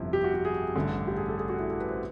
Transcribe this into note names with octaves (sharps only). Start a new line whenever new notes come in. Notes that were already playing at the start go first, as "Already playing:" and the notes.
Already playing: G1 F2 C3 F3 E4
G4
F#4
G4
G#4
A1 G2 D3
G4
G#4
A4
G#4
F#4
E4
A4
B4
C5